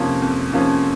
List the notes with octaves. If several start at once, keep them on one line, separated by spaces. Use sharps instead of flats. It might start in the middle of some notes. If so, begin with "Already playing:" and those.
Already playing: F2 C3 F3 A#3 C#4
F2
C3 F3 A#3 C#4